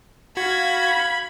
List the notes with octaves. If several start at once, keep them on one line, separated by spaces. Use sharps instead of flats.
F#4 F5 B5 G#6